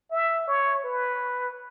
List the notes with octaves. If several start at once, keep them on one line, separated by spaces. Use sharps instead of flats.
E5
C#5
B4